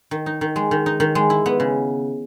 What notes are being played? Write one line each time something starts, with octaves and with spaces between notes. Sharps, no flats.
D#3
D#4
D#3
G#3
D#3
D#4
D#3
G#3
E4
B3
C#3